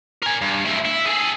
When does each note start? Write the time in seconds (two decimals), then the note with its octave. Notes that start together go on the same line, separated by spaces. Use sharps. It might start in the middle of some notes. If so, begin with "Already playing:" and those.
0.22 A#4 G#5
0.41 G2
0.65 D2 E4
0.85 E4
1.06 G#4 A4